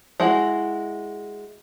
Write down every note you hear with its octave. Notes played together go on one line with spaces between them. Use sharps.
G#3 E4 F#4